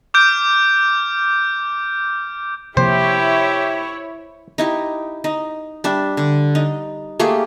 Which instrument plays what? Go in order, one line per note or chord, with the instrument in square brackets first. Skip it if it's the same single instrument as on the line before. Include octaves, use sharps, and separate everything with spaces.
[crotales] D6 F6 G6 D7
[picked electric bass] C3 F3 A#3 [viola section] E4 C#5 [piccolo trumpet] G4 [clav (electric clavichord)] C5
[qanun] D#4 E4 G4
D#4
G3 D4 E5
D3
D#4
A3 A#3 G4 G#4